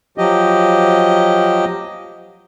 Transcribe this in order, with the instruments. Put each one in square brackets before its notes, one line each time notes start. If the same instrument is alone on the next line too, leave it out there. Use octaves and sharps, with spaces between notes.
[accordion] F3 F#3 G4 D#5